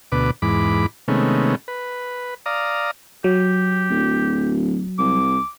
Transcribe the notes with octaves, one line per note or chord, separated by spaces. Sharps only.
D2 B2 B4 D6
E2 G#2 B5 D6
C3 D#3 G#3 A3 B3 C#4
B4
D5 F5 A#5 D#6
F#3 G4
D1
C2 D6